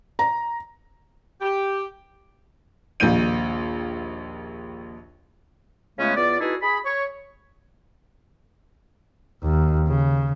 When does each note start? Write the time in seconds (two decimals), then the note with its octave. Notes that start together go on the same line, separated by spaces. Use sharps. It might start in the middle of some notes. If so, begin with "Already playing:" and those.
0.19 A#5
1.41 G4
3.00 A#1 D#2 G6 D#7
5.99 C#3 G#3 A3 B3 C#4 F4
6.16 E2 B3 F4 D5
6.41 D#4 E4 F#4 G#4 A4 B4
6.62 G#4 B5
6.85 C#5
9.43 D#2
9.88 C#3